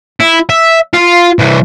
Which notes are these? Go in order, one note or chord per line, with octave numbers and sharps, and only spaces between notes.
E4
E5
F4
C2 E3